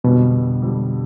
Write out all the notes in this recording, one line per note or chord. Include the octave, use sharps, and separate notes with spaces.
F2 B2 D3 G3
F2 D3 G3